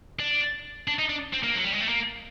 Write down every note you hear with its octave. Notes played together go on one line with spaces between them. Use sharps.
D4
D4
D#4
D4
C4
A#3
F#3
G3
G#3
A3
A#3